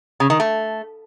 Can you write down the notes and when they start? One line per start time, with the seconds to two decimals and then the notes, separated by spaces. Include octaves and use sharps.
0.20 C#3
0.30 D#3
0.40 A3